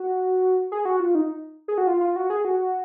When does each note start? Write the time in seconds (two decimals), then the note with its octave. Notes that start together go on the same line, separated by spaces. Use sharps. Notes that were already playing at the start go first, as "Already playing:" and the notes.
Already playing: F#4
0.72 G#4
0.85 F#4
1.00 F4
1.15 D#4
1.68 G#4
1.78 F#4
1.87 F4
2.01 F4
2.16 F#4
2.30 G#4
2.45 F#4